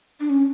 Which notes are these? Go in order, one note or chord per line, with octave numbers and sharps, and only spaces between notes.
D4
C#4